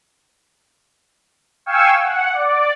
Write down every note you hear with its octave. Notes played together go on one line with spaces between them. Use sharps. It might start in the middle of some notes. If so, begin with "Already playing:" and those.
F5 G5 G#5 C#6 E6
F#5
D5